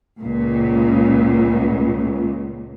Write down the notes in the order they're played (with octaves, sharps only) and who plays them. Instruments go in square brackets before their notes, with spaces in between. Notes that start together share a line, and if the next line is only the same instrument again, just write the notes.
[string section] C#2 A#2